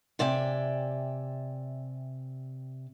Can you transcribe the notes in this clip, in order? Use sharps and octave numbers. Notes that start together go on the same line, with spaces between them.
C3 D5 E5 G5 G#5